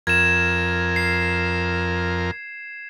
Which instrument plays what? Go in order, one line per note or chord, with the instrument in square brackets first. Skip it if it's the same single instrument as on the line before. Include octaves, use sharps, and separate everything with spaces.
[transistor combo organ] F2 A#4 [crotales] G#6 E7
[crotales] C7